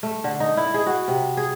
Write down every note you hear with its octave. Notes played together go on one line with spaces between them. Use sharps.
A3
D3
D#4
E4
G#4
F#4
C3
G#4